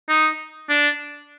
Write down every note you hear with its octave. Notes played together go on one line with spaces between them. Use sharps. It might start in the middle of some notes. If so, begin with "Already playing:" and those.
D#4
D4